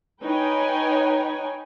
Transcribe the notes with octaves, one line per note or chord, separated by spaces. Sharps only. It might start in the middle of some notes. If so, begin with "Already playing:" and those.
D#4 B4 C#5 G5 G#5